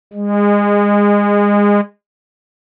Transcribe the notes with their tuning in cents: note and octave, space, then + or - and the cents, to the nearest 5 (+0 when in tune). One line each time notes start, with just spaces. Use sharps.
G#3 -25